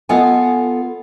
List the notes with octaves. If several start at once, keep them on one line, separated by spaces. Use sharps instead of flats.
B3 F4 A4 D#5 F#5 G#5